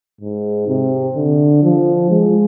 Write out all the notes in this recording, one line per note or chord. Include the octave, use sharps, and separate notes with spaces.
G#2
C3
D3
F3
G#3